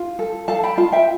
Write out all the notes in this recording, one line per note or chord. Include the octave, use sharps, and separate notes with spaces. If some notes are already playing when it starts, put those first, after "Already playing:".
Already playing: F4
A4
A4 F5 A5
G5 B5
F4 F5 A5
E5 G5